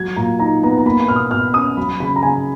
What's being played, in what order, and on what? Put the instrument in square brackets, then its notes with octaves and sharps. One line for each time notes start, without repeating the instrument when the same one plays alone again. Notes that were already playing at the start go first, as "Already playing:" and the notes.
Already playing: [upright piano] F#3 [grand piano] G#6
[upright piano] A#2 [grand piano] A#5
[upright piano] D#4 [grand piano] A#5
[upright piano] B3 [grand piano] A#5
[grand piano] A#5
[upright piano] A#3 [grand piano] B5
[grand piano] B5
[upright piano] B2 [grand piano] F6
[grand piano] D#6
[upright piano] B2 [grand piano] F6
[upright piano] C#4 [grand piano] D#6
[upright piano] F#3 [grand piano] B5
[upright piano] C#3 [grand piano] B5
[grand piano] A#5
[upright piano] C#3 [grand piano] G#5